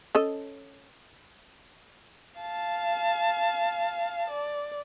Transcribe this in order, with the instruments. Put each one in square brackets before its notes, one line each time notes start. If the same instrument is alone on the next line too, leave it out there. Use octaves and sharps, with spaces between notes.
[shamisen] C#4 A4 D#5
[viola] F5 A5
D5